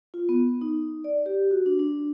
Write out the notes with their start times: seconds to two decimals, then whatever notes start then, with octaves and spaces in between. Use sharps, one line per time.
0.14 F4
0.29 B3
0.61 D#4
1.04 D5
1.26 G4
1.51 F#4
1.66 D4
1.79 D4